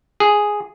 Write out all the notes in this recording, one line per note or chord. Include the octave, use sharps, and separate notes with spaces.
G#4